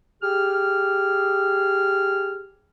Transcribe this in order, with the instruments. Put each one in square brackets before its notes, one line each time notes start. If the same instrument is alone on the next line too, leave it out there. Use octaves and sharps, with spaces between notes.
[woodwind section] G4 G#4 F6